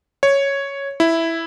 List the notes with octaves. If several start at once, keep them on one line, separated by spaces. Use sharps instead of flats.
C#5
E4